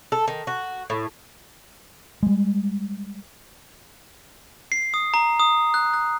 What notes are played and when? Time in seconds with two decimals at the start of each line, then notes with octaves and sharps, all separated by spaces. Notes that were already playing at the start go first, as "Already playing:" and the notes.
0.12 A4
0.28 D#3
0.47 F#4
0.90 A2
2.23 G3 G#3
4.72 C7
4.94 D#6
5.14 A#5
5.40 D#6
5.74 F#6
5.94 F#6